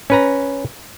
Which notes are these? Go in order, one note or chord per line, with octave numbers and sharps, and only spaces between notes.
C#4 B4 A#5